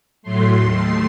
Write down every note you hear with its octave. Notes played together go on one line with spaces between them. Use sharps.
A2 F#3 A3 C6
D#2 D#3 A3